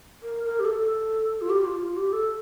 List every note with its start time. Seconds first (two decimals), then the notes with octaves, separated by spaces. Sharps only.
0.23 A#4
0.44 A#4
0.59 G4
0.65 A4
1.41 F4
1.49 G4
1.65 F4
1.80 F4
1.97 G4
2.12 A4